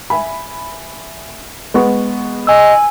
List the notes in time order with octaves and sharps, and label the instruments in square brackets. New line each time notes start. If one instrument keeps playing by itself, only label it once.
[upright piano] E5 G#5 B5
G#3 B3 C#6
[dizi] D#5 [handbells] G#5 E6